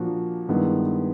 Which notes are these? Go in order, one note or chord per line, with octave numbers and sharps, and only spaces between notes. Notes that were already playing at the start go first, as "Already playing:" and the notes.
Already playing: A#2 F3 A#3 D4 F#4
G2 D#3 G#3 B3 E4